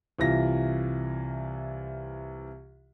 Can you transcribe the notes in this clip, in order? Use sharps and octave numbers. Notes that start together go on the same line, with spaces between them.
C2 E3 F4 A#6